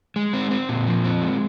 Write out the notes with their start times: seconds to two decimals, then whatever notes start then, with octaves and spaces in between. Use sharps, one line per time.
0.16 G#3
0.34 C4
0.51 C4
0.69 A#2
0.87 F3
1.04 C4
1.21 G#3